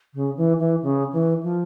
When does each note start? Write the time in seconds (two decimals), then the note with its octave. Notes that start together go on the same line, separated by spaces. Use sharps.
0.14 C#3
0.37 E3
0.59 E3
0.83 C#3
1.13 E3
1.43 F3